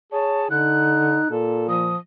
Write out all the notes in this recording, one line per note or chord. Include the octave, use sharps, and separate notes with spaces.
G#4 C#5 A5
D3 D#4 F#6
A#2 A4
F3 D#6